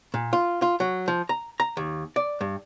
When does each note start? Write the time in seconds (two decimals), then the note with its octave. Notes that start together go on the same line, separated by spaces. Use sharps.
0.14 A#2
0.33 F4
0.62 F4
0.80 F#3
1.08 F3
1.29 A#5
1.60 A#5
1.77 D#2
2.16 D5
2.41 G2